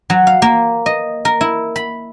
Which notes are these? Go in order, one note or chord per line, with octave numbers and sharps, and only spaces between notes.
F#3
F5
A#3
D#5
A#4
E4
B5